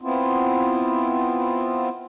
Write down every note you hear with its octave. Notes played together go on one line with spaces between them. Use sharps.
B3 C4 E4 F4